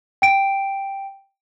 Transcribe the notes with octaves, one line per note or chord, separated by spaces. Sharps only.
G5 D7